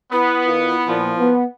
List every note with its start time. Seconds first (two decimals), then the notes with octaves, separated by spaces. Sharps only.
0.12 B3 E4 B4
0.46 D#3 F4
0.87 A#2 F3
1.18 B3